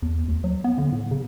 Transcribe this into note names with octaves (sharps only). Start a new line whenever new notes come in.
E2
D#2
F#3
B3
D3
A2
C#3